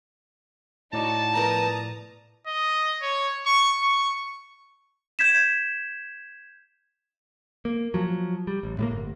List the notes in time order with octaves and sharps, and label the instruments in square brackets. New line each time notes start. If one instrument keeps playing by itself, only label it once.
[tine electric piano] A2 D5 [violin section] D#4 F#4 [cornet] A5
[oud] F3 B3 A#4 [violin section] A#5 D#6
[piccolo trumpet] D#5
C#5
C#6
C#6
[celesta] G6 G#6 B6 E7
[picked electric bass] A#3
F3 F#3
G3
A1
A2 G3 A#3
G1